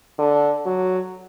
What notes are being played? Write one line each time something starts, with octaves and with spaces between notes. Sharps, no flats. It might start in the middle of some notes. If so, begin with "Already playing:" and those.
D3
F#3